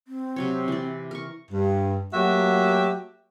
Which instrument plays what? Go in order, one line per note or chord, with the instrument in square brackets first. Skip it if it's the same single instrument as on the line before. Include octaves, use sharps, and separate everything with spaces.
[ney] C4
[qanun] C3 F#3 C#5
E3 D5
A#4 C#6
[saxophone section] G2
F#3 A3 A#3 F#4 G4 E5